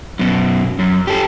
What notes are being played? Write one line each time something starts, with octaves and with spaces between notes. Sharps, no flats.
F#2 B2
F#2
G4 A4